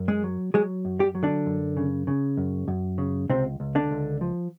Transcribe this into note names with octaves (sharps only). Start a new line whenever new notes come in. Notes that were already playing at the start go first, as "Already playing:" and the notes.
Already playing: F#2
G#3 G#4
F#3
F#3 G#3 G#4
F#2
G3 G4
F#3
D3 D4
F#2
C#3
C#3
F#2
F#2
C#3
C#2 C3 C4
C#2
D3 D4
C#2
F3